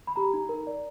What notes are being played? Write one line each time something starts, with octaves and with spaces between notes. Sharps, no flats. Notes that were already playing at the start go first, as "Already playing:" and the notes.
B5
G4 A#5
D#4
A#4
D5